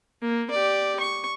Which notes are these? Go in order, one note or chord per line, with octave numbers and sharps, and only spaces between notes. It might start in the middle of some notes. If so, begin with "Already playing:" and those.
A#3
G4 D5
C#6